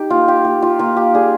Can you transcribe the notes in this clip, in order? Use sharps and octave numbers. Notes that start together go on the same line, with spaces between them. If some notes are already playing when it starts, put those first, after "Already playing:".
Already playing: D#4 G4
A#3 F4
G4
A#3 G4
F4
A#3 F4
G4
G3 G#4